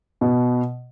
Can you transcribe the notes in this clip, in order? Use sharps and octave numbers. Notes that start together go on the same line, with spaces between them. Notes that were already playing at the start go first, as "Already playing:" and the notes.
B2